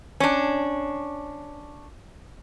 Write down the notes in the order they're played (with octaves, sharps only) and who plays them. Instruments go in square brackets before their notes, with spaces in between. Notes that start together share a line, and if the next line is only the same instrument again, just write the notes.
[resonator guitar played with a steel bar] C#4 D4